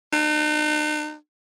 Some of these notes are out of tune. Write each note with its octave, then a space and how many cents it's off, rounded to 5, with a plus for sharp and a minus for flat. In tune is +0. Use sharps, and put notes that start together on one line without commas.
D#4 -45